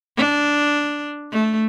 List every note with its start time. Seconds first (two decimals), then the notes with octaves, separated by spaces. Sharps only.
0.17 D4
1.31 A3